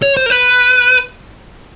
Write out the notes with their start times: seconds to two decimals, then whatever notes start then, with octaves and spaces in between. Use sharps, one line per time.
0.02 C#5
0.17 C5
0.26 A#4
0.30 B4